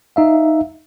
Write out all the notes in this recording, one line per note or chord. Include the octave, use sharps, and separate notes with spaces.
D#4 E5 F5